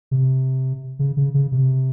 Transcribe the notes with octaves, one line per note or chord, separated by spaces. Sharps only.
C3
C#3
C#3
C#3
C3